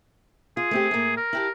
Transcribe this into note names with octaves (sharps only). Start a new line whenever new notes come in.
F4 G#4
A3 C4 G4
A2 A#3
A#4
E4 G4 A5